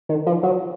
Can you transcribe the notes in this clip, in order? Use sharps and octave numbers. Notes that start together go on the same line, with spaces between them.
D#3
F3
F#3